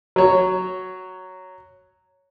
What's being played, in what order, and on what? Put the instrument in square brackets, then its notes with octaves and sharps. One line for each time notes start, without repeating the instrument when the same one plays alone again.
[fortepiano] F#3 C#5